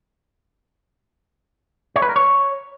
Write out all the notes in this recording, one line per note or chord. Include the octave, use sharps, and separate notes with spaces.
C#5
B4
A#4
C#5